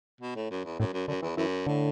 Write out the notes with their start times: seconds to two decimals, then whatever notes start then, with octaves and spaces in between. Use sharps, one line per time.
0.21 B2
0.36 A2
0.51 F#2
0.65 E2
0.80 F#2 A2
0.93 F#2
1.08 F#2 D3
1.22 E2 E3
1.37 F#2 E3
1.67 A2 D3